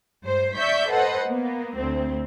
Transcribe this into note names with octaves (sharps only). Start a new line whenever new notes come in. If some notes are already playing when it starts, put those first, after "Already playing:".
G2 C5
D5 E5 C#6 G6 B6
A4 B4 C5 D#5 F#5
A#3 B3
D2 C4